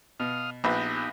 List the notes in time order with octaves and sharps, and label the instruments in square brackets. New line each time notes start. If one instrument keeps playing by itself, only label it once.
[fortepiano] B2 [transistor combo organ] F5 D#6 F6
[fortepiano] A#1 B4 [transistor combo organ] B3 D#4 G4